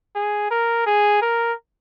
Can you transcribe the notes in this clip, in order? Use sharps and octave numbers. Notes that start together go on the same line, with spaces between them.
G#4
A#4
G#4
A#4